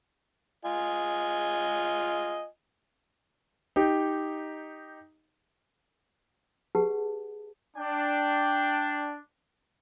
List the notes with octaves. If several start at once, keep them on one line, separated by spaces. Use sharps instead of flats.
F4 D#5 G#5
D#4 G4
G4 G#4 B4 F#5 A5
D4 G5